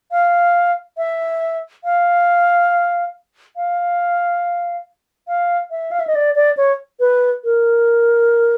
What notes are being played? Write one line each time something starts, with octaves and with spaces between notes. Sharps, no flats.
F5
E5
F5
F5
F5
E5
F5
E5
D#5
D5
D5
C#5
B4
A#4